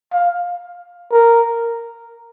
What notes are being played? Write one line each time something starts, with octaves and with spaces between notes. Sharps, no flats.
F5
A#4